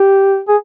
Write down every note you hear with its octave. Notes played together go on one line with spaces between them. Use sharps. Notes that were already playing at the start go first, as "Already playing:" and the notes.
Already playing: G4
G#4